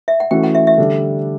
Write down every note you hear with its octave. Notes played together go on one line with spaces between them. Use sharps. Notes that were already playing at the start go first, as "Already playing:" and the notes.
E5
F#5
E3 A3 C#4 F#4 A4 G5
F#5
E5
E5
D3 G3 D4 A4